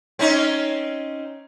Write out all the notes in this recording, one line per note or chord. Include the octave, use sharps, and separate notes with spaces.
C4 C#4 D#4